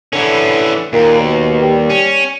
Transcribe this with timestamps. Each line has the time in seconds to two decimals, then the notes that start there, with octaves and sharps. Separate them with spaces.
0.13 D3 E3 C#4
0.93 D#2 A#2
1.19 B2
1.62 G3
1.90 C#4